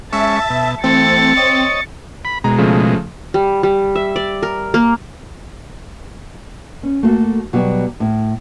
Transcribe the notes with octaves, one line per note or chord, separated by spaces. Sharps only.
G#3 C#4 E5 A5 C#6
B2
E3 A3 C4 A6 C#7
C#5 D#5
B5
B2 G#3 A#5
C#3 F3 A3
G3
G3
E5
D5
A#4
A#3
C#4
A3 A#3 F#4 A4
B2 F#3 G3 B3 G4
A2